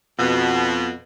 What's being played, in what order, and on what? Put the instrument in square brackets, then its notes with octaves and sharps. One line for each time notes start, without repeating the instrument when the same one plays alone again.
[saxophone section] F2 B2